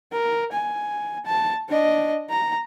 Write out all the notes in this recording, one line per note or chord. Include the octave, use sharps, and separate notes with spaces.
A#4
G#5
A5
D4 D#5
A#5